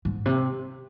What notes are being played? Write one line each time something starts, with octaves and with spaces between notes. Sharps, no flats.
G#2
C3